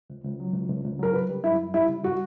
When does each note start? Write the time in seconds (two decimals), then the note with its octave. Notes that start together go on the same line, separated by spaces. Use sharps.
0.10 C#2
0.24 C#2
0.40 F#3
0.54 C#2
0.69 C#2
0.85 C#2
1.00 F#3 A#4
1.13 C#3 B4
1.29 G3
1.43 F#2 E4
1.59 F#2
1.74 G3 E4
1.89 C#3
2.03 G3 F#4